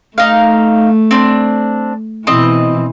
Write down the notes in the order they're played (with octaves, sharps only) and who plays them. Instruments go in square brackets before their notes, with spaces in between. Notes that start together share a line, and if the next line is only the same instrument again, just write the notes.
[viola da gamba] A3 [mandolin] D#4 F5
[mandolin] C4 D4
[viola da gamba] B2 E3 [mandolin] C4 D#5